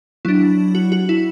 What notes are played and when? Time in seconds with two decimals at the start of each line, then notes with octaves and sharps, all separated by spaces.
0.25 F#3 D4 E4
0.75 F#4
0.92 F#4
1.09 E4